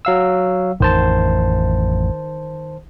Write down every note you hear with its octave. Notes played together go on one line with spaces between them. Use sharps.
F#3 F5 E6
A1 F2 D#3 C5 A5